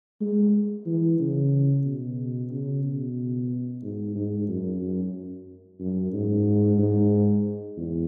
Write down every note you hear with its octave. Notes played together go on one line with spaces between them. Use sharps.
G#3
E3
C#3
B2
C#3
B2
G#2
G#2
F#2
F#2
F#2
G#2
G#2
E2